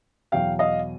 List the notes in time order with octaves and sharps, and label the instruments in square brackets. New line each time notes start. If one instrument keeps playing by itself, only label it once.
[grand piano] E2 B2 F#3 F5 G5
D#5 F5